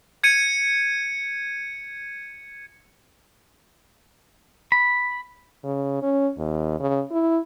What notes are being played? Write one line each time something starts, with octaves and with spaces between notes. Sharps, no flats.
G#6 C#7 D#7
B5
C#3
C#4
D#2
C#3
E4